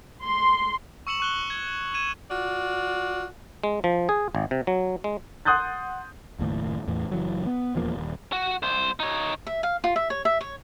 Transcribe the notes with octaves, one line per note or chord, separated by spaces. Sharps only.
C6
C#6 E6 C#7 E7 F#7
C#6 F#6 G7
G#6
G#6 D#7 E7
F4 F#4 D5
G#3
F3
G#4
G#1
C3
F#3
G#3
F#5 C6 D#6 F#6 G6 A6
F#1 D#2 A2
E2 A2 E3
F#1 E3 F#3
B3
D#1 E2 F3 A#3
D#1
F#4
C2 C5
D#4 C#5
E5
F5
F4
E5
C#5
E5
C#5